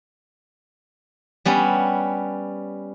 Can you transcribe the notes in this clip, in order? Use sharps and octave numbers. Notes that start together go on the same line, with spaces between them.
G3 B3 C#4